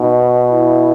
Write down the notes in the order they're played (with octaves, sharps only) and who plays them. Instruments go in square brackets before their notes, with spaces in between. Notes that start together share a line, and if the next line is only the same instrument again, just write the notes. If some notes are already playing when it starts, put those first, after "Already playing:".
Already playing: [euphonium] B2 [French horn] D#4
[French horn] E4